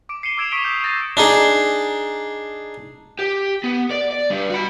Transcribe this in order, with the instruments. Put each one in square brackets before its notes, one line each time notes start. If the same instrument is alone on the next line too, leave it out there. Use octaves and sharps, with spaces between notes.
[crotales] D6 D7
C7 C#7 D#7 E7 G7
D6 E6 G#6 D7 E7 F7
C#6 D#6 B6 D7 D#7 G7
D6 D#6 G6 E7
E6 G6 A6 A#6 C7 D#7
[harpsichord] D4 D#4 G#4
[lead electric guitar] G4
B3
D5
D5
G3 D4
F#4 B5